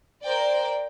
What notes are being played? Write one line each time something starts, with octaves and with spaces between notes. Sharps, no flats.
A#4 C5 D5 G5